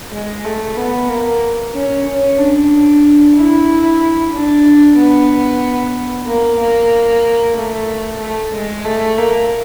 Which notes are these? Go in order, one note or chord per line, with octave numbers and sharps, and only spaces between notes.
G#3
A3
B3
A#3
C#4
C#4
D4
E4
D4
B3
A#3
A#3
A3
A3
G#3
A3
A#3